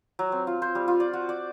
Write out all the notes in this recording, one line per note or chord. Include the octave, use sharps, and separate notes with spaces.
F#3
C4
F4
C5
G3
F4
D5
F#4
D5